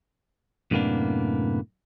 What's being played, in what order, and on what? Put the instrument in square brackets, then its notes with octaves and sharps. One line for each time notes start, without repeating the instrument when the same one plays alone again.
[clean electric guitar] F#2 A2 C3 A#3 B3 D4